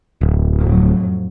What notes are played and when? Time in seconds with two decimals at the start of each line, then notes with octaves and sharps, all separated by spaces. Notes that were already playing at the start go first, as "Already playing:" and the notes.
0.21 D1
0.60 F2 A2 F#3